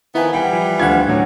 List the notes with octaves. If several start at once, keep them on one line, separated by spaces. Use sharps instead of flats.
D#3 F3 B3 E4 G#5
E3 G3 F#5 G5
F3
D2 D4 F4 F5 F#5 G#6
A2 D3 F#3 C#4